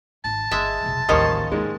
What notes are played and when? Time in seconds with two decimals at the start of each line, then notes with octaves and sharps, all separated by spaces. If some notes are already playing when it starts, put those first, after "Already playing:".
0.25 G#1 A5
0.51 G1 G#3 E5
0.83 F1 B1
1.09 A1 D#2 D#3 F3 G3 C#4 D#5 F5
1.52 D#2 G#2 G#3